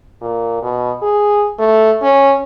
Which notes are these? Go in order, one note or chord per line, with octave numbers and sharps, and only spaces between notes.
A#2
B2
G#4
A3
C#4